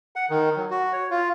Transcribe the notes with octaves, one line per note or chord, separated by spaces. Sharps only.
F#5
D#3
F#3
F#4
C#5
F4